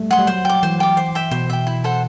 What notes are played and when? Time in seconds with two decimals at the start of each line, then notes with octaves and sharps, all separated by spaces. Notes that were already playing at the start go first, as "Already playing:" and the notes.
Already playing: G3 A3
0.11 F#3 F#5 C6
0.19 G3
0.27 F#3 C5
0.45 F#3 G5 D6
0.63 E3 C5
0.80 G5 D6
0.97 C5
1.15 E5 G5
1.31 B2 C5
1.50 E5 G5
1.67 E4
1.84 A4 C5 F#5